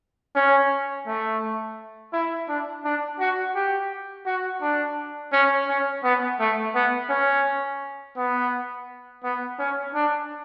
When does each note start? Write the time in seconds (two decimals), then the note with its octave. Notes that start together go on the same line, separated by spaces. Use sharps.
0.35 C#4
1.06 A3
2.13 E4
2.49 D4
2.84 D4
3.19 F#4
3.55 G4
4.26 F#4
4.62 D4
5.32 C#4
5.68 C#4
6.03 B3
6.40 A3
6.75 B3
7.10 C#4
8.17 B3
9.24 B3
9.59 C#4
9.94 D4